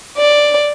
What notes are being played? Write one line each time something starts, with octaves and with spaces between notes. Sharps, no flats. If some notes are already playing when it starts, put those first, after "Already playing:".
D5